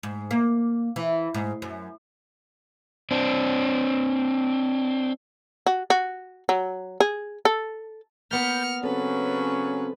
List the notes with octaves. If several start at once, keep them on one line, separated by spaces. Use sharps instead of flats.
G#2
A#3
E3
G#2
F#2
C4 D4
F#4
F#4
F#3
G#4
A4
A#3 B3 A#4 A5 B5 F6 G6 C#7
C#3 F#3 C4 C#4 A4 B4